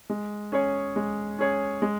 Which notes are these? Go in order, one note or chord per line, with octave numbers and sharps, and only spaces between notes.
G#3
C#4 G#4 C#5
G#3
C#4 G#4 C#5
G#3